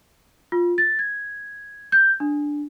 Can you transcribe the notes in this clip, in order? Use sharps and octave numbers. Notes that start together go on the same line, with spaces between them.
F4
A6
G#6
G6
D4